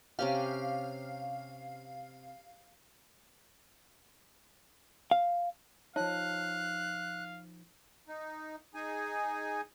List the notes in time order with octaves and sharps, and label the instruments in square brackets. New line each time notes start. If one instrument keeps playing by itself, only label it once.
[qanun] C3 C#4 G4 [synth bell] F5
[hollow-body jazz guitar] F5
[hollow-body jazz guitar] F3 D#4 [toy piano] C#5 A5 [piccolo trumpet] F5 [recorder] F#6
[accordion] D#4
D#4 G#4 G#5